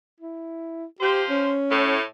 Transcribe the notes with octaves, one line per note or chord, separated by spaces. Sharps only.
E4
F3 G4 C5
C#4
A2